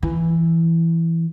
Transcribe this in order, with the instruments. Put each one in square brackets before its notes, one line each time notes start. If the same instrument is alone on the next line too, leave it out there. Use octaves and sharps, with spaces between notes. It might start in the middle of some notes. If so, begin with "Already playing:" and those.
[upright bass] E3